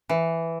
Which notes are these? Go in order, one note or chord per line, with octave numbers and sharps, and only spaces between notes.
E3